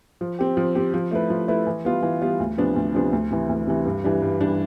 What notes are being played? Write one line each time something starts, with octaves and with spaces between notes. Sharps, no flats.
F3
C4 G4
F3
C4 G4
F3
A3 E4 B4
F3
A3 E4 B4
E3
G3 B3 F4
E3
G3 B3 F4
D2
C3 F3 B3 D4
D2
C3 F3 B3 D4
D2
C3 E3
D2
C3 E3
G2
E3 G3 D4
G2
E3 G3 D4